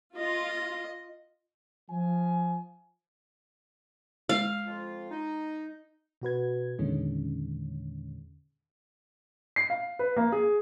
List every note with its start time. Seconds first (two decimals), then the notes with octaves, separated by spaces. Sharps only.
0.17 F4 D#5
1.90 F3 G#5
4.29 G#3 F5
4.66 F2 F4
5.11 D#4
6.22 B2 F#4 B4 G#6
6.79 E2 A#2 D3 D#3 G#3 C#4
9.56 C7
9.70 F5
9.99 B4
10.17 A#3
10.32 G#4